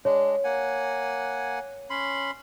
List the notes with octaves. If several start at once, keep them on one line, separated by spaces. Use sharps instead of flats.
G#3 D4 C#5
A#3 F#5 G#5
C#4 B5 C6